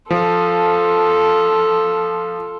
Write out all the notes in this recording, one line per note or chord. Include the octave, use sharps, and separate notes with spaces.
F3 F4 A4